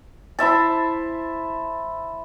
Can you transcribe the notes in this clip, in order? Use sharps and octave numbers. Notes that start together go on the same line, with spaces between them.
E4 C5 E5 A5